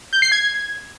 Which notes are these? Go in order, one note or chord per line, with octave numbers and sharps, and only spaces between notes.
G6
C7
G#6